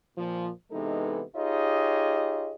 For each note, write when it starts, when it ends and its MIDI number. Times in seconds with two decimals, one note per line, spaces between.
0.17 0.50 46
0.17 0.50 53
0.71 1.22 48
0.71 1.22 52
0.71 1.22 56
0.71 1.22 59
0.71 1.22 63
0.71 1.22 69
1.36 2.54 63
1.36 2.54 65
1.36 2.54 67
1.36 2.54 68
1.36 2.54 73
1.36 2.54 75